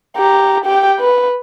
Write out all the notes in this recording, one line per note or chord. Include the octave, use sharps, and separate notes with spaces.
G4 A#5
G4 G5
B4